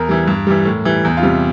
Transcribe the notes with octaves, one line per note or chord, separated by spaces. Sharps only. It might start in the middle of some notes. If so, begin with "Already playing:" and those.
Already playing: E2 A#4
E3 G3
G2
E3 G3
A2
E3 G3
E2
F4
C3 G3